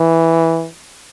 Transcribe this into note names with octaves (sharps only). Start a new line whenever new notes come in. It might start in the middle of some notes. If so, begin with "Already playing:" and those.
Already playing: E3